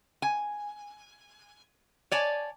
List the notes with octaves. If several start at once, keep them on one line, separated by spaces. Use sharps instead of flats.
G#5
C#5 D5 G#5 A5